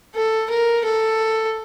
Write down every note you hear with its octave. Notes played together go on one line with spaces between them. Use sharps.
A4
A#4
A4